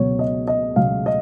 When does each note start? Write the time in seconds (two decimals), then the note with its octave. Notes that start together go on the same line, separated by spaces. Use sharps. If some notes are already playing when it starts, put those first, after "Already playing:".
Already playing: C#2 B2 F#3 C#5
0.19 D#5
0.48 D#5
0.76 C#2 B2 F#3 F5
1.06 D#5